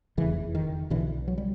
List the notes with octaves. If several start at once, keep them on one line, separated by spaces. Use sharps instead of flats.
F1 E2 C#3 E3
D#3
B1 B2 D3 E3
F#3
G3